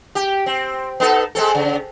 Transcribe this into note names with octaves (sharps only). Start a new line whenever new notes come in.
G4
C4
B3 D#4 A4
G#3 C4 A4
C#3